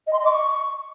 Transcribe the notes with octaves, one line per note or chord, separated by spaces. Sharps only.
D#5
C6
D#5
D6
C#6